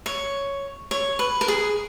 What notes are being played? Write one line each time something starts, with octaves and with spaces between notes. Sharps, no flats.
C#5
C#5
B4
A#4
G#4